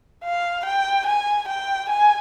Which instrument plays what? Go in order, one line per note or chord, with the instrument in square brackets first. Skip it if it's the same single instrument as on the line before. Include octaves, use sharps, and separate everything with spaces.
[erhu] F5
G5
G#5
G5
G#5